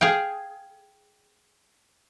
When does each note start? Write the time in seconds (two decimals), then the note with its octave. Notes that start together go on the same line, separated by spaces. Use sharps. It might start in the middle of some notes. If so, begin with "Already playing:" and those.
0.01 G#4 F5 G5